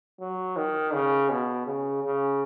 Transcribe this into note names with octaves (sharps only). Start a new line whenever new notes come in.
F#3
D#3
C#3
B2
C#3
C#3